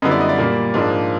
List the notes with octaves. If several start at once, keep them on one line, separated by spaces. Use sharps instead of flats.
F#2 D3 G3 B3 E4 D#5
D5
D#5
D5
A#2 G3 A#3
G#2 F3 A#3 D4